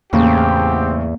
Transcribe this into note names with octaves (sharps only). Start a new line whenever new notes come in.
E2 A2 C#3 A#3 C4 G4